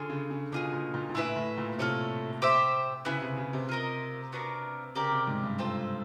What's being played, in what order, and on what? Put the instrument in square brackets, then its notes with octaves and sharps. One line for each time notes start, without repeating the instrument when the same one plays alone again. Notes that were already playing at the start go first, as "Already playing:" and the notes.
Already playing: [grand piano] D3 [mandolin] C#4 F4 G#4
[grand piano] C#3
C#3
[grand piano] B2 [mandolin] D4 F4 G#4
[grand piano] A#2
A#2
A#2
[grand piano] A2 [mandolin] E4 G#4 B4 E5
[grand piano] A2
A#2
[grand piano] C3 [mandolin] F4 A4 C#5
[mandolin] G4 C5 E5
[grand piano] C#3 [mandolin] B3 E4 G#4
[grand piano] C3
C#3
C3
[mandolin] F4 A#4 D#5
B3 D4 F#4 A#4
[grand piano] C#3 [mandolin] G4 A#4 D5
[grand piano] C3
G#2
G2
[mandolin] C4 F4 A4 C5